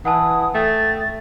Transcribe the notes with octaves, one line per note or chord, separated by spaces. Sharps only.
E3 F#5 G#5 A5 D#6
A3 G5 A6